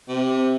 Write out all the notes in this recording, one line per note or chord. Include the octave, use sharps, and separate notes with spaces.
C3